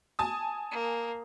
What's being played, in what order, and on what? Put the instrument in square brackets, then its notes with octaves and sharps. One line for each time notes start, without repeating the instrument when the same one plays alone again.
[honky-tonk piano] G#5 A5 D#6
[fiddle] A#3